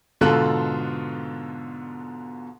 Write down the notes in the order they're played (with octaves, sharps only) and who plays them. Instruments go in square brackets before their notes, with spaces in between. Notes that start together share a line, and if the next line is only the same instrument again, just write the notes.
[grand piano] G#2 B2 D3 F4 A4 F#6